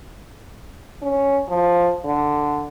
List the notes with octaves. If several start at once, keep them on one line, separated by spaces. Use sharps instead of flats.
C#4
F3
D3